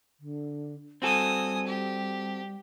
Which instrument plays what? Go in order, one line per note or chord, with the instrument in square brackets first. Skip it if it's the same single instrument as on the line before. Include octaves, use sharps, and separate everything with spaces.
[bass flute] D3
[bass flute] G3 [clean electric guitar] C4 F#4 A4 [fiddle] G#5 D#6
[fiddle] G4